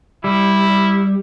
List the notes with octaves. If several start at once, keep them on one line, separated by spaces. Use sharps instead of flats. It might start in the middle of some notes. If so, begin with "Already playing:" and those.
G3 E4